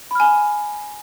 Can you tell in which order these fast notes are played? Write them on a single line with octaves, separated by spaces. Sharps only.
B5 F6 G#5